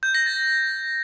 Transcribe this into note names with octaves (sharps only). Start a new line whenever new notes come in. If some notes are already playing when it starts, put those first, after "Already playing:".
G6
A#6
A6